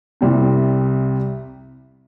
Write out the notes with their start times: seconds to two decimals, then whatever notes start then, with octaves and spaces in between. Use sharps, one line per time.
0.21 C2 C3 G3 C4